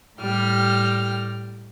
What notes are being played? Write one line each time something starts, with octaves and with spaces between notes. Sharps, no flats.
A2 G3 G5 F6